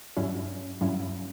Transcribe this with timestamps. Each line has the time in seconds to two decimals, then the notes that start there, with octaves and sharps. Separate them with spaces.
0.17 G2 F#3 C#4 E4
0.81 G2 F#3 C#4 E4